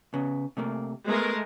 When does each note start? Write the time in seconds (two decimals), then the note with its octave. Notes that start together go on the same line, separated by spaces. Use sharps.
0.14 C#3 B3
0.57 C3 A3 A#3
1.08 G#3 A3 B3 A#4